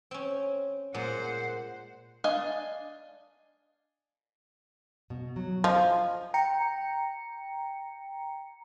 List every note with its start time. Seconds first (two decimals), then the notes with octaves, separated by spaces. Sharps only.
0.11 C4 C#4
0.94 A#2 G#3 C5 F#5
2.24 D4 D#5 F5 G#5
5.10 B2
5.36 F#3
5.64 F3 D#5
6.34 G5 A#5 C#7